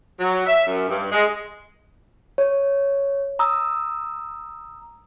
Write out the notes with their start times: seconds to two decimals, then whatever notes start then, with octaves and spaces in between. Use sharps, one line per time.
0.20 F#3
0.46 E5
0.67 F#2
0.89 G2
1.11 G#3
2.38 C#5
3.39 A#5 D#6 E6